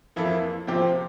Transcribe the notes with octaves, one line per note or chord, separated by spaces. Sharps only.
F2 E3 A#3 E4 A4
C3 F3 C4 G4